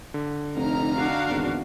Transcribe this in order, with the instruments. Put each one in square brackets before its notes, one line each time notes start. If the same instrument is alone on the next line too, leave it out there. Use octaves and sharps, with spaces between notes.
[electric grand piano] D3
[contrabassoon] F1 [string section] D#4 A#5 F6
[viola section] D4 F#4 F5
[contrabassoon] G#1 [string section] E2